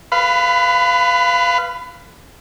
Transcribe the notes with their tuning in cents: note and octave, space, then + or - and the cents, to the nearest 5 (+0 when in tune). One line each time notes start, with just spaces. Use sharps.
B4 +0 F5 -15 B5 +25